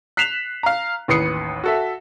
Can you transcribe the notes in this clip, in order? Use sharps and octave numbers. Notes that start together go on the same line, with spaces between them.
F#6 B6 C7 E7 F7
F5 A#5
A1 D#2 B4 D#6 C7 C#7
F#4 A4 E5